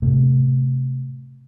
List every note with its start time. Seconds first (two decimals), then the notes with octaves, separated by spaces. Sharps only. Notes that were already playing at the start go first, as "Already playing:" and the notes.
0.02 A2 C3 A3